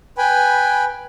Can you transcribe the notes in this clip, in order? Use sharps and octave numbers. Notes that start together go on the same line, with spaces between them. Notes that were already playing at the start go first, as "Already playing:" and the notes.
B4 G5 G#5 B5